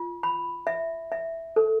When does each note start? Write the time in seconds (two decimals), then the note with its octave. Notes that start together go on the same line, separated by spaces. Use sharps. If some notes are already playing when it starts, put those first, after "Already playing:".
Already playing: F4
0.23 B5
0.67 E5
1.12 E5
1.56 A4